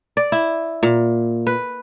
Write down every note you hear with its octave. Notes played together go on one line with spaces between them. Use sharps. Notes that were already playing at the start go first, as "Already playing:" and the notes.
D5
E4
A#2
B4